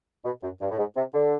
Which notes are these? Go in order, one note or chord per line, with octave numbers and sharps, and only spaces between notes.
B2
F#2
G2
A2
G#2
C3
D3